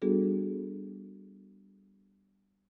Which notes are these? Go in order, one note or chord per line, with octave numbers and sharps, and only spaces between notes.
G3 B3 D4 F#4 G#4 A4